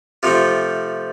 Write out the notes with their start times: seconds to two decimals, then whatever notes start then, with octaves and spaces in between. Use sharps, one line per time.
0.23 C3 F3 A3 C4 F4